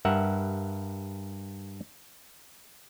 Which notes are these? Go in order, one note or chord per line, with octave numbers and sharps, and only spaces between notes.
G2 A#4 E5 F#5